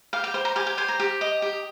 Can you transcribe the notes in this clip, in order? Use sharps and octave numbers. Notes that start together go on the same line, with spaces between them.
G4 F5
G5
C5
A#5
G4 G#5
G5
C5 G#5
A#5
G4
D#5
G4